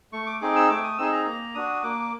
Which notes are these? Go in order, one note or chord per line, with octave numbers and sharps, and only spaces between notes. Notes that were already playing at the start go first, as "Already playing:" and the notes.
A3 C#6
D6
C4 D#4 G#4 D6
E6
A3 D6
D#6
C4 D#4 G#4 E6
A#5
A#3 A#5
D4 F#4 D#6
A#3 D6